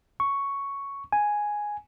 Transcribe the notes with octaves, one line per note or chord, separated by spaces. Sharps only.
C#6
G#5